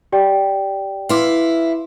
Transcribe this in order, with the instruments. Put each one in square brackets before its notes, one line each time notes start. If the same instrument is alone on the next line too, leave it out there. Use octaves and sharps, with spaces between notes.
[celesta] G4 D5 G5
[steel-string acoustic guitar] E4 F5 [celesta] B4 C6 D6